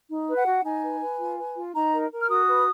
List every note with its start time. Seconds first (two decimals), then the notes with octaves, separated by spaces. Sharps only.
0.09 D#4
0.27 B4
0.36 F#5
0.45 F#4
0.63 D#4 G#5
0.83 B4
1.00 B4
1.19 F4
1.38 B4
1.55 F4
1.74 D#4 A#5
1.93 A#4
2.11 A#4
2.20 F6
2.29 F#4 D#6
2.47 B4